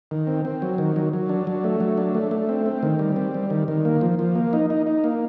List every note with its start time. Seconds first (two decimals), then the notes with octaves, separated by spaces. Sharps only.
0.11 D#3
0.27 C4
0.45 C4
0.62 F#3
0.78 D#3
0.96 F#3
1.13 F#3
1.29 D4
1.47 F#3
1.64 A3
1.80 F#3
1.98 D4
2.15 A3
2.31 A3
2.49 C4
2.66 C4
2.83 D#3
2.99 G3
3.16 C4
3.34 G3
3.50 D#3
3.68 D#3
3.85 A#3
4.01 F3
4.19 F3
4.35 A#3
4.53 D#4
4.70 D#4
4.86 D#4
5.04 A#3